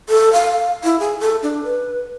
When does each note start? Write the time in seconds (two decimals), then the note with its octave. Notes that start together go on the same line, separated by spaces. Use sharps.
0.09 A4
0.33 F5
0.84 E4
1.00 G#4
1.20 A4
1.43 D4
1.64 B4